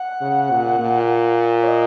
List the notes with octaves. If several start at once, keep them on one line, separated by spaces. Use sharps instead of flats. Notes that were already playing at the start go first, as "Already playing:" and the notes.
Already playing: F#5
C#3
A#2
A#2
C#5
D#5